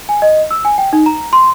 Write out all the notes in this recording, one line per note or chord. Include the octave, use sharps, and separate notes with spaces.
G#5
D#5
E6
G#5
G5
D#4
A#5
C6